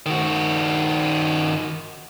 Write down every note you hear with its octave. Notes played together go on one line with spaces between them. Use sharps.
D#3 F#4